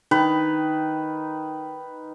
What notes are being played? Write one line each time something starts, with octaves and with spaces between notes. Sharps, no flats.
D#3 B4